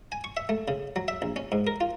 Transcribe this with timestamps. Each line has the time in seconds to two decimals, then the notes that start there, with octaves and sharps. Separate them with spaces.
0.12 G#5
0.24 C#6
0.37 E5
0.49 A3
0.68 C#3
0.96 F#3
1.08 E5
1.22 A#1
1.36 C#4
1.52 G#2
1.67 A#4
1.81 F4